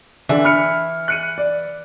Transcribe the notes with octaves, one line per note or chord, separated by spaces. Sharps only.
D3 E3 D4
B5 F6 C#7
F#6 C#7 D#7
D5